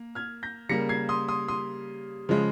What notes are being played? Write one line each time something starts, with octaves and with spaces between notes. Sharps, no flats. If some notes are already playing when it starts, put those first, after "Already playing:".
Already playing: A#3
F6 G#6
G6 A#6
C#3 G3 A#3 A#6 C#7
G#6 C7
C6 D#6
C6 D#6
C6 D#6
C#3 F3 G#3